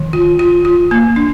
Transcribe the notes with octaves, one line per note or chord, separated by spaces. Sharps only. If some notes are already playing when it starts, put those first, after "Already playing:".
Already playing: D#3
F4
F4
F4
A#3
D4